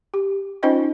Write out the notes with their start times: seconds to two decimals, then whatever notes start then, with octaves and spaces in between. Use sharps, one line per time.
0.14 G4
0.63 C#4 D#4 F4 C5 D#5 G5